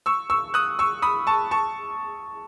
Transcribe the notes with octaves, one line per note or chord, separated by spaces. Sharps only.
C#6 E6
C#6 E6
D#6 F#6
C#6 E6
B5 D#6
A5 C#6
A5 C#6